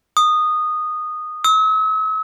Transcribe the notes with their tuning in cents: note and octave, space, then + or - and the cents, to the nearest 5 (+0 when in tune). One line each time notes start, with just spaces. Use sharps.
D#6 -15
E6 -45